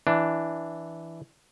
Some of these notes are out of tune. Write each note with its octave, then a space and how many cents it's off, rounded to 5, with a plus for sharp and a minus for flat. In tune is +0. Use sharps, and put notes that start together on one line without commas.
E3 +0 D4 +0